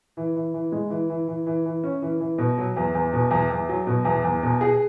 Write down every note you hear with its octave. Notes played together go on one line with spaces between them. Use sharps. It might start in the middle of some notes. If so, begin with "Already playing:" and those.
E3
E3
E3
G#3
E3
E3
E3
E3
E3
C#4
E3
E3
B2
F#3
E2
E2
B2
E2
E2
F#3
B2
E2
E2
B2
G#4